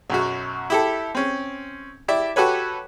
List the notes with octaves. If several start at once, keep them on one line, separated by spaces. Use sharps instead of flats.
B1 F#2 F#4
E4 G4 A4
C4 C#4
E4 G4 D5 E5
F#4 G4 A4 B4 C#5